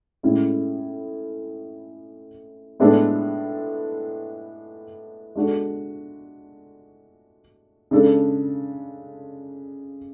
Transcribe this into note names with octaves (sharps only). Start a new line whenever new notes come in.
A2 G#3 C#4 E4
A2 G#3 B3 D4 A4
G#3 D4 F#4 A4
C#3 G#3 D4 A4